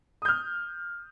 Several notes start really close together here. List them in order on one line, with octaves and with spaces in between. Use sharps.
D#6 G6 F6